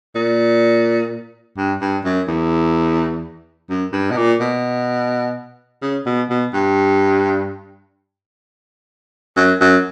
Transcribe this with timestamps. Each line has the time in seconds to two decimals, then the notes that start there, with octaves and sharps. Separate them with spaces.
0.15 A#2
1.57 G2
1.81 G2
2.04 F#2
2.28 E2
3.70 F#2
3.93 G2
4.11 B2
4.17 A#2
4.41 B2
5.82 C#3
6.06 B2
6.30 B2
6.54 G2
9.36 F#2
9.61 F#2